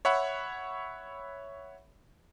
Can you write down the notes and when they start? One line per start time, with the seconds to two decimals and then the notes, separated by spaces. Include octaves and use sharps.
0.05 C#5 E5 F#5 B5